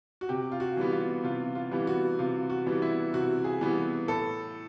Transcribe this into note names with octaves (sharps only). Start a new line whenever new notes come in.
F#4
C3 G4
F4
F#4
E3 G3 B3
F4
C3 F4
F4
E3 G3 B3
F#4
C3 F4
F#4
E3 G3 B3
E4
C3 F#4
G#4
E3 G3 B3
A2 A4